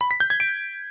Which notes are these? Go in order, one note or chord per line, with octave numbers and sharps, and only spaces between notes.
B5
B6
G6
G#6
D7